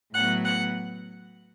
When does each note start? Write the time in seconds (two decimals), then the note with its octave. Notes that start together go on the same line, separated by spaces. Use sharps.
0.14 A2 F#3 B3 F#5 F#6
0.45 F#5 F#6